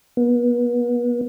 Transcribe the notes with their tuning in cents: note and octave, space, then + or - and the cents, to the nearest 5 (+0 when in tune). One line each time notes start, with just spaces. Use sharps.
B3 -35